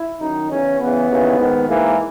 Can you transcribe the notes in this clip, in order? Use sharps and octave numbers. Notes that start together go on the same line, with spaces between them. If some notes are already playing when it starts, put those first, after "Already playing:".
Already playing: E4
F#2 D#3 D#4
E2 C#3 E3 C#4
E2 C#3 E3 B3
D#2 C#3 E3
G#2 D#3
G#2 E3 A#3